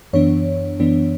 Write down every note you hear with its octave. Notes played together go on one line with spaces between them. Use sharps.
F#2 E3 B3 D4 C#5
F#2 E3 B3 D4